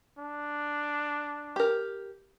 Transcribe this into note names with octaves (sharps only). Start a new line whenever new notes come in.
D4
G4 A#4